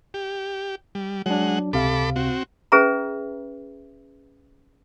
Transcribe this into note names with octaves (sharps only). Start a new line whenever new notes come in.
G4
G3
F#3 G#3 D4 F#5
C#2 C3 A4 F5 B5 D6
C4 F#4
C#4 G#4 B4 E5 A#5